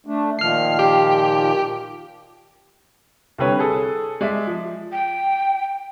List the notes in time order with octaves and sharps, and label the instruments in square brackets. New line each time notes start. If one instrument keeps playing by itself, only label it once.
[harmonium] A3 D4
[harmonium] A#2 D#3 F3 [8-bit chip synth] F6 C7
[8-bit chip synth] G4
[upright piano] C2 D3 G3 C4 B4 C#5
G#4 A4
G#3 D5 E5
F3
[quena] G5